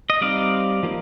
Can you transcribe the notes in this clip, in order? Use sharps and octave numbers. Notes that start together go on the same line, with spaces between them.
D#5
G3 C4 D#4 D5 F5
F3 A#3